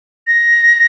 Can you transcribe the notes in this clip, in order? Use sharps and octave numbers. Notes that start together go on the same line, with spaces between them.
A#6